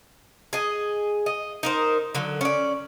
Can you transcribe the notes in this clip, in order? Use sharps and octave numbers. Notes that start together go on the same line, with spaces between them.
G#4 D#5
D#5
D#4 A#4 C5
D3 F#3
C#4 D5